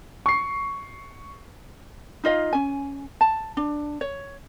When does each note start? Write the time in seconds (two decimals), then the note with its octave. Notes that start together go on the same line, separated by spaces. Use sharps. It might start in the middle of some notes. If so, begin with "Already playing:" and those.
0.26 C#6 C7
2.24 D#4 F4 D#5 F5
2.53 C#4 G#5
3.21 A5
3.57 D4
4.01 C#5